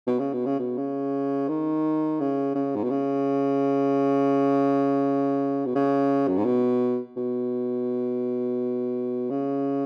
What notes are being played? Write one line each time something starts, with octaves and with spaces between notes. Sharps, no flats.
B2
C#3
B2
C#3
B2
C#3
D#3
C#3
C#3
G#2
B2
C#3
B2
C#3
F#2
G#2
B2
B2
C#3